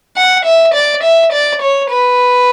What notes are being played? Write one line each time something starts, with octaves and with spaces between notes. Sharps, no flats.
F#5
E5
D5
E5
D5
C#5
B4